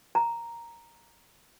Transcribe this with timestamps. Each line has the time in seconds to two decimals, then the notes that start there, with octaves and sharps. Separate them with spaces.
0.15 A#5